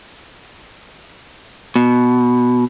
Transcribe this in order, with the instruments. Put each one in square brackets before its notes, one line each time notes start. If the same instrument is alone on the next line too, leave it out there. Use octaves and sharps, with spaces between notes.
[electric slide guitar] B2